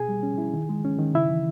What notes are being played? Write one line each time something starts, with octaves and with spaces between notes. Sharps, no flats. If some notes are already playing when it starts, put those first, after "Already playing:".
Already playing: B2 G#4 G#5
G3
C#4
E4
D#3
G#3
C#4
D#3
C#3 E4 E5
E3